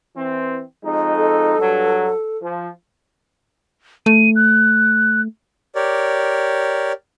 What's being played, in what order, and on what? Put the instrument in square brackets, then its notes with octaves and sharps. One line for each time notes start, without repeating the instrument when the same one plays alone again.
[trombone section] E3 C4
F2 G#3 D#4
[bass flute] A4
[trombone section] G2 F#3
F3
[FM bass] A3 [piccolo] D#7
[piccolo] F#6
[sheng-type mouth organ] G4 A#4 C#5 D5